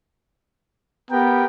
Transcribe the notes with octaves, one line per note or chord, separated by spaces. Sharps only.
B3 G4 A#4 G5